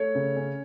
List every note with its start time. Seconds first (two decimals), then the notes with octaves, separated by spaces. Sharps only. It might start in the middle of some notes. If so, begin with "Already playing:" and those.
Already playing: A3 C#5
0.15 C#3
0.37 C#4